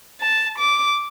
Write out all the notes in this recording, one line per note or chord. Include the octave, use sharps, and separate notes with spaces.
A5
D6